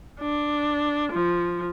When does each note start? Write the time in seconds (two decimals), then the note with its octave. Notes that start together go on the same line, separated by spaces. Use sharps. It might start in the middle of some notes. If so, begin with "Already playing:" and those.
0.20 D4
1.12 F3